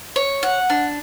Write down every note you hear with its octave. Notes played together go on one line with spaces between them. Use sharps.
C#5
F#5
D4